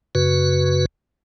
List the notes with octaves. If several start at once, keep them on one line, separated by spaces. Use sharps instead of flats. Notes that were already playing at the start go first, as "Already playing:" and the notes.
F#2 C#3 F#4 B4